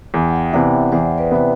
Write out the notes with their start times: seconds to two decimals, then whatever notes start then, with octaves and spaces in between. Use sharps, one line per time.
0.14 E2
0.22 G5
0.29 F#5
0.35 E5 G5
0.53 C3 E3 B3 D5 F#5
0.92 E2 C5 E5
1.18 B4 D5
1.31 C3 E3 B3